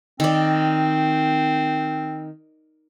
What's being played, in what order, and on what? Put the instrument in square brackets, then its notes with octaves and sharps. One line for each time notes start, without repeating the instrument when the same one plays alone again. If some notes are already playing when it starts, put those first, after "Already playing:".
[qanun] D#3 D5 [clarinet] C4